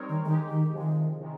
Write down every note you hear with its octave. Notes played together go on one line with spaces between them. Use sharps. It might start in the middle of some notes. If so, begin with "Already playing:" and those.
Already playing: G3 C4 D#4 A#4 C#5
D#3
D#3 G#3 D#4 G4
D#3
C3 D#3 F3 G#3
C3 D#3 G#3